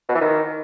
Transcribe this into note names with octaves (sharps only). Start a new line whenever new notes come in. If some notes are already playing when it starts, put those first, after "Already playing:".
B2
E3
D#3